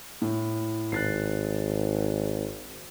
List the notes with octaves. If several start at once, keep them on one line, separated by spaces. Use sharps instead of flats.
A2
G#1 F#6 A6 C7